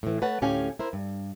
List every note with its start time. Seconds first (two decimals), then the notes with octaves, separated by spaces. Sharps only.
0.03 A2 E3
0.22 A3 B4 C#5 F#5 A5
0.42 D2 A2 C#4 G4 F5 G#5
0.79 E4 A#4 C5
0.93 G2